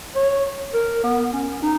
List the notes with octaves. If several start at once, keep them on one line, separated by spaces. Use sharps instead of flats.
C#5
A#4
B3
C#4
D#4